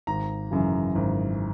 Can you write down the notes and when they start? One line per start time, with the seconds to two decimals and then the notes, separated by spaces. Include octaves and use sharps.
0.07 G#1 A#5
0.51 F#2 C#3 E3
0.95 G#1